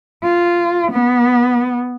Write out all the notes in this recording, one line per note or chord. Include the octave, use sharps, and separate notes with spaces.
F4
B3